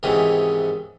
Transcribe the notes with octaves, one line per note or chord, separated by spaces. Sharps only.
G#2 C3 D#3 E3 C#4